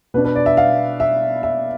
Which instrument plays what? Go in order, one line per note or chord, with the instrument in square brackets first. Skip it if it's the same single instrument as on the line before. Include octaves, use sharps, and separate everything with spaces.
[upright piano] B2 B3 D4 B4
B4
D5
E5
F5
E5
E5